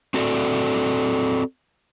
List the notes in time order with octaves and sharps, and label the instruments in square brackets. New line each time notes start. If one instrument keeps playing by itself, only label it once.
[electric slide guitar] C4 F#4 A4 D5